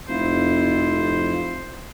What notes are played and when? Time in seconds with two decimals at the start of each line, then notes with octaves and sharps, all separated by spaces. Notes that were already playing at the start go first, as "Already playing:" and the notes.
0.08 F1 F2 E4 F4 C5